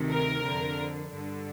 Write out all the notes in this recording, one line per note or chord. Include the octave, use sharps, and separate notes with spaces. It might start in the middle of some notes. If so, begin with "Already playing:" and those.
Already playing: D2 C3 D#3
A#4
F2 D3
G2 D3